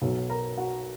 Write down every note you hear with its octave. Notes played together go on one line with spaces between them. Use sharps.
B1 B2 F#3
A#4 A#5
F#4 F#5